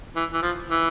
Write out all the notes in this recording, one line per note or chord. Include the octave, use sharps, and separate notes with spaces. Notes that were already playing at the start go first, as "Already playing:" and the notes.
E3
E3
F3
E3